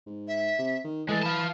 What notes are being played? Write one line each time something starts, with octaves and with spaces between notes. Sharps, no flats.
G#2
E5
C3
D#3
E3 G#3 A4
F4 A5 B5